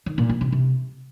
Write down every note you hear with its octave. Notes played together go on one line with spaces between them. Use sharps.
D#3
A#2
F3
C3
C3